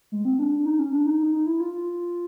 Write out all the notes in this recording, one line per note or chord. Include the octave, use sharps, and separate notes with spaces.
G#3
C4
D4
D4
D#4
C#4
D4
D#4
D#4
D#4
E4
F4
F4